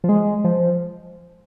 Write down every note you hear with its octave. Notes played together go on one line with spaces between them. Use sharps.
F3
G#3
F3